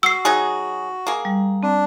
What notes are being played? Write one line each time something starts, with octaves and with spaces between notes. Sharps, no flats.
F#4 E6 C7
F#3 D#4 G#4
A#3 G#4
G3
C4 D4